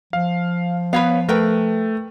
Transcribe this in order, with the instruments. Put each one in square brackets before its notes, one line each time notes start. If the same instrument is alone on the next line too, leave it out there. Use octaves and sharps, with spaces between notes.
[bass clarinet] F3 [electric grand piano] F5
[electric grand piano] B3 [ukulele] B4 C#5 F5
[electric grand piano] A3 [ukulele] A#4 B4 G5